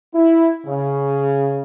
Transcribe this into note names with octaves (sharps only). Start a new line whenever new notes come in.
E4
C#3